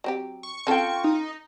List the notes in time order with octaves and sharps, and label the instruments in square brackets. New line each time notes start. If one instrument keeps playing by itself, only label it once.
[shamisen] F#3 C4 G4
[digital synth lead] C#6
[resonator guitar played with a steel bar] C4 F4 G5 [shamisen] C#4 A4
[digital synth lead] D#4